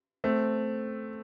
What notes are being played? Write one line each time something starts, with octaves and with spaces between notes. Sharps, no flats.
A3 C4